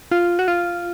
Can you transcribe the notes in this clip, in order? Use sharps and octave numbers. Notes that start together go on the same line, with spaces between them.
F4
F#4
F4